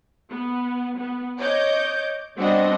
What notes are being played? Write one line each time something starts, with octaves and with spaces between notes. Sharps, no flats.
B3
B3
C#5 D#5 D6 G6
G3 B3 C4 D4 F#4 D#5